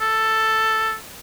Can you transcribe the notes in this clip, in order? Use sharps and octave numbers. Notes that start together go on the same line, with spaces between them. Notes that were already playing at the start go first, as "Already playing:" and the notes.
A4